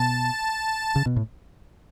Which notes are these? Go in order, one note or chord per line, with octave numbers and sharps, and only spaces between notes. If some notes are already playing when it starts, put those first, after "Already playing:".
Already playing: B2 A5
C#3
B2
A2